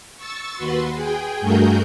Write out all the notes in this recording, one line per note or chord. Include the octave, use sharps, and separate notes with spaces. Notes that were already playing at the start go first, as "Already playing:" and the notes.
C#6 E6 A6
D#2 F#4 B4 C6
G#4 G5 G#5
G2 A3 F#4 G#4 A#4 G6